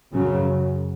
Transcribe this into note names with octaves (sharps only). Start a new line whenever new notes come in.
F#2 C#3 F#3